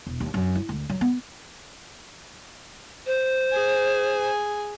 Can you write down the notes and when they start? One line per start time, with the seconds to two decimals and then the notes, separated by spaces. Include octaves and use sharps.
0.07 E1
0.20 D#2
0.34 F#2
0.55 E4
0.69 D2
0.90 F#3
1.01 B3
3.06 C5
3.52 G#4 G#5